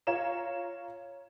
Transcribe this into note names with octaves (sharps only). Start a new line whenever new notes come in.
F4 C#5 A#5 E7